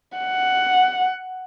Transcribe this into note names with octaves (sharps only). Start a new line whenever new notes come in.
F#5